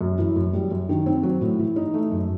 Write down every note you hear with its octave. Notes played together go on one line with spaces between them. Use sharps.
F#2
E3
F#2
G3
F#2
D#3
C4
F#3
A2
E3
D#4
A3
F#2